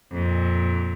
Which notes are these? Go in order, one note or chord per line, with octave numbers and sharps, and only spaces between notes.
F2 A#2